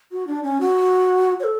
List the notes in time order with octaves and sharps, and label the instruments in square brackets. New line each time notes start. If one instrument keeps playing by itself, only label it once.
[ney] F#4
D4
C#4
F#4
C#5
A4